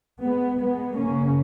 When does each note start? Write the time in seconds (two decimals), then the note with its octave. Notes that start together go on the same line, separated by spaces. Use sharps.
0.22 G#3 B3
0.60 G#3 B3
0.96 F#2 C#3 A#3 C#4